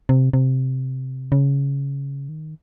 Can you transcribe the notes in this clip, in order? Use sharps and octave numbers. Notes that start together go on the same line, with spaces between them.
C3
C3
C#3
D#3